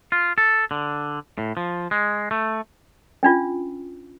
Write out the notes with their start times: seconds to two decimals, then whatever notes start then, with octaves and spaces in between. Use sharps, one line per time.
0.12 F4
0.38 A4
0.71 D3
1.38 A2
1.57 F3
1.91 G#3
2.31 A3
3.23 C#4 D4 F4